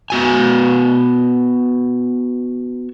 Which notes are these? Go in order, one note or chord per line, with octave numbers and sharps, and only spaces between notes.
B3 F#4 G#5